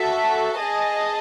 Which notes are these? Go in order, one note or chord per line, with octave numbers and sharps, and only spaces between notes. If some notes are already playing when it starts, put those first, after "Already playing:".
Already playing: F#4 A4 E5
G#4 D#5 A5